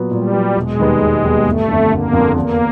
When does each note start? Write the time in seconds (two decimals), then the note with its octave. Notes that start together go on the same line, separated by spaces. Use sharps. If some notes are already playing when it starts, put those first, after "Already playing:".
Already playing: A#2 F#3 B3
0.11 A#2 G3
0.34 F#3 B3
0.56 E1 G#3
0.78 D#2 D#3 G3 B3
1.01 E1
1.24 D#2 D#3 G3 B3
1.46 G1 A3
1.68 F2 D3
1.91 G1 A#3
2.13 F2 D3
2.36 E2 A#3